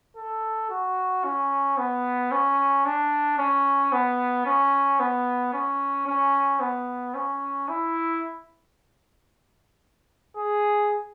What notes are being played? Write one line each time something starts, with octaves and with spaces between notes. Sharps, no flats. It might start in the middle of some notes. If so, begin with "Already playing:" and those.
A4
F#4
C#4
B3
C#4
D4
C#4
B3
C#4
B3
C#4
C#4
B3
C#4
E4
G#4